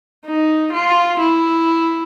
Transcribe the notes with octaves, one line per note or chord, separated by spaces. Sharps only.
D#4
F4
E4